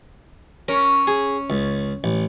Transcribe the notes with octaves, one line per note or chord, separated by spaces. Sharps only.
C#4 A#4
G#4
C#2
A1